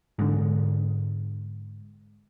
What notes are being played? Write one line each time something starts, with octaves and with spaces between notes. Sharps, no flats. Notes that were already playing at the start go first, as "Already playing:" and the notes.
G#2 D3